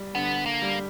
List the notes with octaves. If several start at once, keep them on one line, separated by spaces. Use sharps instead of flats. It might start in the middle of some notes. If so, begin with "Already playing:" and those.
Already playing: G3
D3 B3
A#3
G3